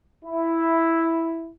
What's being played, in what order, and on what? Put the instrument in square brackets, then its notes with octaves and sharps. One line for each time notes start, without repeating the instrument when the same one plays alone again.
[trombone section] E4